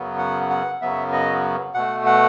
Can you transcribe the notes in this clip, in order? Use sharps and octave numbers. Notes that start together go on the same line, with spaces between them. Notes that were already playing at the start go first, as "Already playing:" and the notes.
Already playing: F#2 C#3 F#3 B3
F#5
F#5
F#2 C#3 F#3 B3 E5
D#5
B2 A3 F#5
F#5